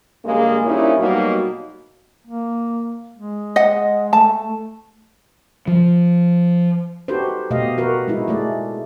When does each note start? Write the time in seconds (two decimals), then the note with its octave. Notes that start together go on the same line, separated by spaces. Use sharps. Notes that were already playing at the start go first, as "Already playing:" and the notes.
0.25 G2 C#3 G#3 A#3
0.64 G2 A#2 C#4 D#4 E4
0.99 B2 F#3 G3 A#3 D#4 F#4
2.27 A#3
3.15 G#3
3.56 D#5 F#5
4.13 A3 A5
5.68 F3
7.08 D#4 F#4 G4 A4 B4 C5
7.50 B2 A3 G4 D#5 F5
7.78 F#4 A#4 B4
8.08 G#3 D#4 E4
8.28 G#3 A3 D5